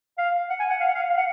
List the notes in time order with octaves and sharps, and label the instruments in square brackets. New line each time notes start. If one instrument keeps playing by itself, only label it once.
[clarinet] F5
F#5
G#5
F#5
F5
F#5
F5
F#5
F5
F#5